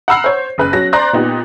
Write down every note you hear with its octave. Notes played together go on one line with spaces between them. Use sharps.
F#5 A#5 B5 E6 F6 C7
C5 C#5
F#1 B4 F#6
F#3 C#4 A#6
C5 D5 A#5 C6 F#6
A#2 B3 D#4 G4